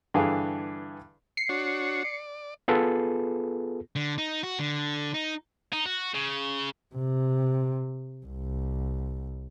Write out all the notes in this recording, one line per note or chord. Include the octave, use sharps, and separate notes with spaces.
G2 D3 E3 G#4 A4 F5
C7 C#7
D4 F#4 C#5
D5
B3 F4 G#4 A4 B4
D3
D#4
F#4
D3
D#4
D#4
F#4
C#3
C3
C2